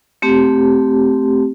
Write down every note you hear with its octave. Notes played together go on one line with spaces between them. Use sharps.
A3 C4 G4